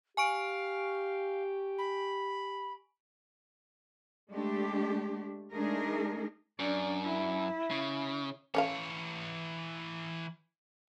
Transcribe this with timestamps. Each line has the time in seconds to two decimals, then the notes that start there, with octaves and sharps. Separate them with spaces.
0.17 G4 F5 G#5 C#6 D7
1.78 B5
4.30 G#3 A3 D4 G4
5.53 G#3 A3 D4 D#4 G#4 A#4
6.59 F#2 D4 D5
7.03 E4
7.71 C#3
8.55 E3 C#4 A4 C#5 F5